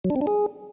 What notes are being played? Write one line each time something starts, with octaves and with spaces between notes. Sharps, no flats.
F#3
D4
C4
D4
G#4